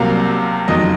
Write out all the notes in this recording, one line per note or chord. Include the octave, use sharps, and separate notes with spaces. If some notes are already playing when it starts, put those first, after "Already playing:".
Already playing: C2 C3 F#3 A#3 F5
F#1 F2 D#3 F#3 D#5